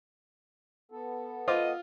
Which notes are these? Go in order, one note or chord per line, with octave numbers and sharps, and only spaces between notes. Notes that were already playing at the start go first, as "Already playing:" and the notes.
B3 A4
F4 C5 D#5 C6 D6